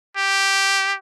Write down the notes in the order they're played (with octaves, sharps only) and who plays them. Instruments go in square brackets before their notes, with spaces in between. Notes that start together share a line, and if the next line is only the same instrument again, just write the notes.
[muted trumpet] G4